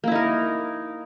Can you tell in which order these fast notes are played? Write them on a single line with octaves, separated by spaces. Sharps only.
A#3 E4 D#4 A#4